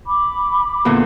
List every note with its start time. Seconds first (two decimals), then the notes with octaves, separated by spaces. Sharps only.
0.07 B5 D6
0.85 E2 A#2 D3